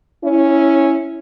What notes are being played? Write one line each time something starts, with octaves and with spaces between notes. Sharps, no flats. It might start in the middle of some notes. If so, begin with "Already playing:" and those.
C#4 E4